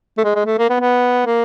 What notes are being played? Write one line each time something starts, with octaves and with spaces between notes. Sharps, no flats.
A3
G#3
G#3
A3
A#3
B3
B3
A#3